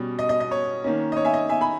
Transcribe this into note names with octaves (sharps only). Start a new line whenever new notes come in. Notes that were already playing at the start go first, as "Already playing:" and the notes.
Already playing: B2 G3 C#4
D#5
D#5
D#5
C#5
D#3 A#3 C#4
D#5
C#5
E5 G#5
D#5
E5 G#5
G#5 B5